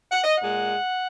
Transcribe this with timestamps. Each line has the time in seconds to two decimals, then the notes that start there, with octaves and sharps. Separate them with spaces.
0.11 F#5
0.23 D#5
0.36 F#5
0.43 A#2 G#3